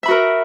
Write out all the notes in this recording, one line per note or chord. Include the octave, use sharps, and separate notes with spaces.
F#4 A#4 E5 B5